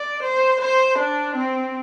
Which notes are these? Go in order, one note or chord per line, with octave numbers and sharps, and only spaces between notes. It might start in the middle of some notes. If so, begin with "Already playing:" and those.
Already playing: D5
C5
C5
D4
C4